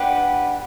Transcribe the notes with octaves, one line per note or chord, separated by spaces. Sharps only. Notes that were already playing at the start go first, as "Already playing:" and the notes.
Already playing: D4 G4 B4 F#5